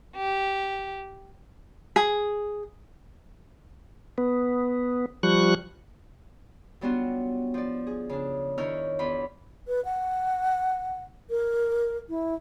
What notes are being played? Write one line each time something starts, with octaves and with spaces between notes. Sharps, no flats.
G4
G#4
B3
F3 G3 C#6 F#6
F#3 G3 B3 D4 F4 F#4
F3 D5
G#4
C#3 D4
D#3 D4 E4 C#5 F6 G6
E2 F4 B5
B4
F#5
A#4
E4